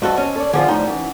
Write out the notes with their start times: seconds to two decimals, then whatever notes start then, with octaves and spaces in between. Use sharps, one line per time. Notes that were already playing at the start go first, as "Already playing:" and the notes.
0.02 G2 F#4 A4 C5 D#5
0.17 C#4
0.36 A4 C#5 D5
0.53 G2 D3 F3 C4 F4 G#4
0.68 A2 F3 G3 D#4 C6
0.86 F#2 E3